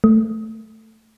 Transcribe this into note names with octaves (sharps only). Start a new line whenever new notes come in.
A3